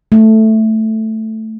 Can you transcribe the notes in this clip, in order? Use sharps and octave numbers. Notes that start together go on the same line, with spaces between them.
A3